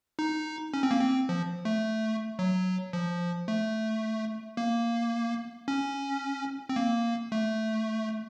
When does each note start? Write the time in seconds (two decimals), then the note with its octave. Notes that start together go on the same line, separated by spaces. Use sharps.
0.19 D#4
0.74 C#4
0.83 C4
0.91 A#3
1.00 C4
1.29 F3
1.65 A3
2.39 F#3
2.93 F3
3.48 A3
4.57 A#3
5.68 C#4
6.69 C4
6.76 A#3
7.32 A3